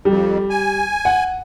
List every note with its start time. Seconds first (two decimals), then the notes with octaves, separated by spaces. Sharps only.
0.05 F2 G3
0.50 G#5
1.05 F#5